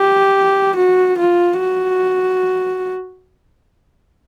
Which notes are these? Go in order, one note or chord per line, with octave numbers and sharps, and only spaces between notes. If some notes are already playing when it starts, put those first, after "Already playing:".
Already playing: G4
F#4
F4
F#4